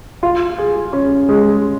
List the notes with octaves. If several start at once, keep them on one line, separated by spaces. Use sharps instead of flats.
F4
G#4
C#4
G#3